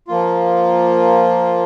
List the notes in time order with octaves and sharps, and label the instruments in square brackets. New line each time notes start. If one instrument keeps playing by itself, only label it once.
[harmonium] F3 A#3 F4